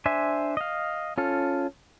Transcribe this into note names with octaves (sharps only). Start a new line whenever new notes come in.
D4 C5 E5 G#5
D#5 F5
C#4 F4 A4